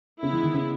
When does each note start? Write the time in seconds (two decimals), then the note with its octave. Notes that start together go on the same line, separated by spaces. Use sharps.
0.22 C#3 G#3 B3 E4
0.33 E3
0.43 D#3
0.54 C#3